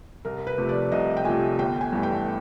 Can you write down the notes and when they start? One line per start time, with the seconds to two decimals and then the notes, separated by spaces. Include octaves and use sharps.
0.25 C2 A#4
0.47 B4
0.58 C3 F3 A3
0.69 D5
0.92 C2 D#5
1.17 G5
1.25 C3 F3 A3 G#5
1.59 G1 G5
1.81 G#5
1.92 G2 E3 A3
2.03 G5